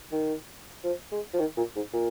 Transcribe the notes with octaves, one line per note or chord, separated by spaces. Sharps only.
D#3
F3
G#3
F3
D#3
A#2
G#2
A#2